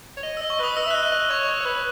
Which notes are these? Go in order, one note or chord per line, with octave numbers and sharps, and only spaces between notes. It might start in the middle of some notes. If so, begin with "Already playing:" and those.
C#5
D#5
E6
D#5
C#6
B4 D#6
D#5 E6
E5
F#6
D#5
F#6
D#5
C#5 C#6
C#5
C#5
B4